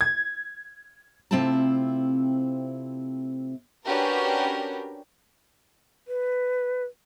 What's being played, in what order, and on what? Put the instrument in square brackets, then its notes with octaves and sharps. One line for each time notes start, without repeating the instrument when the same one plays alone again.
[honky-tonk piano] G#6
[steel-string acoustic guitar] C3 A3 C4 E4 F4 A5
[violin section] C#4 D4 F#4 G4 A#4 B4
[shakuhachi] B4